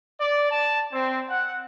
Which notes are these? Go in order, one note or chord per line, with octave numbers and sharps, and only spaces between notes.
D5
A5
C4
F#5